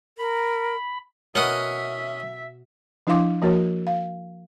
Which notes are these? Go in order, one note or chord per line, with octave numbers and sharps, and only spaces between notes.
A#4 B5
B2 C#4 A#4 D#5 E5 F#5
F3 D4 E4 F5 C6 D6
F3 A#3 F#4 A#4 C#5
F5